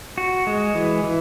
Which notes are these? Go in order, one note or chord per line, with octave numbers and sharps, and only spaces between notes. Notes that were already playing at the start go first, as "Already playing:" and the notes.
F#4
G#3
E3
E3